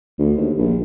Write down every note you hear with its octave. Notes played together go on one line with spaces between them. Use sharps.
D2
D#2
A#1